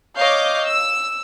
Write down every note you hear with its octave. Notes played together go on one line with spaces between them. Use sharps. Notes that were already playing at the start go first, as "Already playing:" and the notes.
C#5 D#5 F5 D6 G6
E6